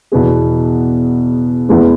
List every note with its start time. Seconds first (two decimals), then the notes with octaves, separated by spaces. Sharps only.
0.12 E2 B2 B3 G#4
1.69 E2 E3 G#3 B3